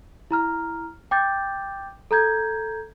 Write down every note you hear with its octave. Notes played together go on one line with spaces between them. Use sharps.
E4 A#5 F6
G5 D6 G6 A6
A4 A#5 G6 G#6